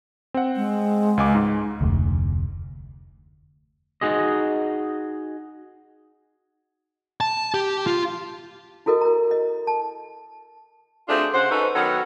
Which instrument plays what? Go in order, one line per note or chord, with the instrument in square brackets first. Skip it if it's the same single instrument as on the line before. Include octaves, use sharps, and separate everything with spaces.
[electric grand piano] C4 F#5
[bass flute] G#3
[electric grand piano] C#2 G#5 D6
G#2
[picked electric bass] F1 D2
[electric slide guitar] D#4 F#4 G#4 D#5
[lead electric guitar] A5
G4
F4
[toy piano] E4 F#4 A4 A#4 D#5
A#4 A#5
D#5
A5
[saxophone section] A3 C4 D4 F4 F#4 G#4
C#3 C5 F#5
C#4 D#4 F#4 A4 B4 C5
D#3 F#3 B3 A4 A#4 F#5